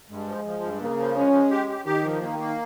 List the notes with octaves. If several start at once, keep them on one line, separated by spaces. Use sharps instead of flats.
G2 G#3
F3
F3
G2
C#3 A#3
F3
G#3 C#4
G#3
G4
G4
D#3 G4
F3
D#3 A#3
A#3